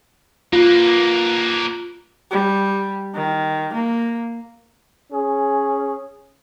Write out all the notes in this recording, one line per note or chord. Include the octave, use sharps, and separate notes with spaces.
A#3 F4 B4
G3
D#3
A#3
C#4 G#4